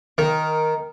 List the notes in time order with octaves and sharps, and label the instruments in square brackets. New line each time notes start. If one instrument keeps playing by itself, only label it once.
[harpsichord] D#3 [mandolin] A#4